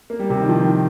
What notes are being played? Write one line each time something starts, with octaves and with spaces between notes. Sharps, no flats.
A#3
G3
C3
D#3
F3
D#3